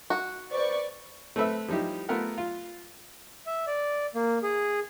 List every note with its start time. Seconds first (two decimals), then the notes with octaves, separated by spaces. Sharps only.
0.10 F#4
0.52 B4 C5 D5 C#6
1.36 A3 C4 A4 B4 E5
1.68 F3 G3 D#4 E4 G4
2.09 A3 B3 F4 A#4 F#5
2.38 F4
3.46 E5
3.67 D5
4.15 A#3
4.43 G#4